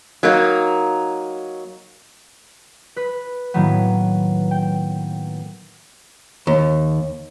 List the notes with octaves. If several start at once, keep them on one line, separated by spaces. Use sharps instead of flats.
F#3 A#3 D#4
B4
A2 D#3 F#3 A#3 B3
G5
D#2